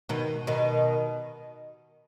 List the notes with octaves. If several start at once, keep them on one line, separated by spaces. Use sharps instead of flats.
B2 D#3
B2 D#3